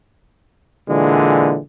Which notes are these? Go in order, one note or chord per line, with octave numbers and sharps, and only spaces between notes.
A#2 D3 E3 G#3